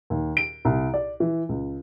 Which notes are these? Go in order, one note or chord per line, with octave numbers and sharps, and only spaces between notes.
D#2
D7
C2
D5
E3
C#2